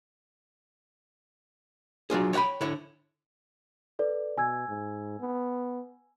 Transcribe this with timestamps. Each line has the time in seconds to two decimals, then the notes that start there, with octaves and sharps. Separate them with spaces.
2.10 F#3 D4 F4 G#4
2.33 C#5 D5 F#5 G5 B5
2.61 D3 E4 C#5
3.99 A4 B4 D5
4.38 B2 G#5 E6 G#6
4.69 G#2
5.20 B3